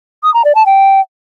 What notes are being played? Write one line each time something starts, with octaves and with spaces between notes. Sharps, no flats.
D#6
A#5
D5
A5
G5